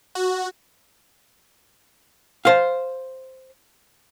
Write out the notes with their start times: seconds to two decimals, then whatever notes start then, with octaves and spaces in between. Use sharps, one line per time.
0.15 F#4
2.45 C5 F5